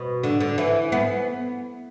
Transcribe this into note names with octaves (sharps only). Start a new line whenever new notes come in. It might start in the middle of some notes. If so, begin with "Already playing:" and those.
Already playing: B2
D3
D3
E3
B3